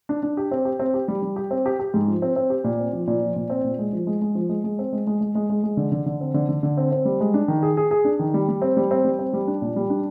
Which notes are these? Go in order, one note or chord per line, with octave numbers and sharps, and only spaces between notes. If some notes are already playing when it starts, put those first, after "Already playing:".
D4
D4
G4
C4
G4
C4
G4
G3
G3
G4
C4
G4
G4
G#2
F3
C4
C4
G4
A#2
C4
F3
A#2
F3
A#2
C4
A#2
G#3
F3
G#3
G#3
F3
G#3
G#3
C4
G#3
G#3
G#3
G#3
G#3
G#3
D3
D3
D3
C4
D3
D3
D3
C4
C4
G3
G#3
D4
D#3
G#4
G#4
G#4
D4
D#3
G3
G3
C4
G3
C4
G3
C4
G3
D4
A#2
G3
D4